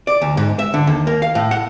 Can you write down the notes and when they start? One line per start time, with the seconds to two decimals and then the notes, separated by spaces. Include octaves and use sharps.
0.07 D5
0.21 D2
0.37 G#2
0.59 E5
0.74 D3
0.87 D#2
1.07 A#3
1.22 F5
1.35 A2
1.51 F#5